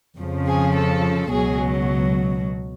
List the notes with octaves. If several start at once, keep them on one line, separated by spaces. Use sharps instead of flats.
F2 C#3 F3
G#4
A4
C#2 B2 F#3 G#4